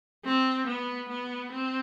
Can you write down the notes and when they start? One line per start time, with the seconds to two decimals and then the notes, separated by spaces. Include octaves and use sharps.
0.25 C4
0.67 B3
1.09 B3
1.52 C4